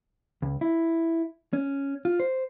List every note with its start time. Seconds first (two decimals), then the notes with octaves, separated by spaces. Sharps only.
0.42 C#2
0.61 E4
1.53 C#4
2.05 F4
2.20 C5